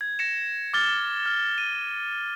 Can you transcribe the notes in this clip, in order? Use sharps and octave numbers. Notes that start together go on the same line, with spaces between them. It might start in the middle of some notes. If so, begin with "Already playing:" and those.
G#6
A#6 C#7 E7
D6 F6 A6 G7
F6
D#7